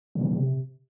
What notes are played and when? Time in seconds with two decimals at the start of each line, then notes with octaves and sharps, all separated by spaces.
0.15 B2
0.21 C#3
0.27 B2
0.33 C3